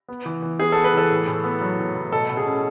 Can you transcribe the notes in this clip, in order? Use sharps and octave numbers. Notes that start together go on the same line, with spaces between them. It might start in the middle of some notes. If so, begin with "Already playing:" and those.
B3
E3
E3
B3 G#4
A4
B3
B4
E3 A4
A2
A2
B3
F#3
A2
A2
B2 A4
B2
G#4
C#4